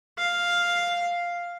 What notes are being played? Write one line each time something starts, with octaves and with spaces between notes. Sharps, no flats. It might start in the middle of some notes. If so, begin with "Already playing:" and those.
F5